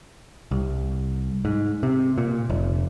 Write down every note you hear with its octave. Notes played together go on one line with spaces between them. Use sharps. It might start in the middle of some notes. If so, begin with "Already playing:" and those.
C2
G#2
C3
A#2
F1